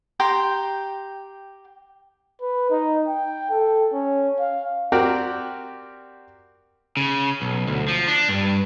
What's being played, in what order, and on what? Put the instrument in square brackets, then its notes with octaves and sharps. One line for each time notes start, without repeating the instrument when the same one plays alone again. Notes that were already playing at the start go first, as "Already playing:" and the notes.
[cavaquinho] G4 G5 A#5 C6
[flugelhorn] B4
D#4
G5
A4
C#4
F5
[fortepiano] C4 F#4 G4 A#4 D5
[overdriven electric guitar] C#3
B1
D2
F3
D4
G2